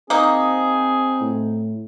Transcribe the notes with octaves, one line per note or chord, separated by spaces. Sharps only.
A#3 C4 D#4 G#4
A2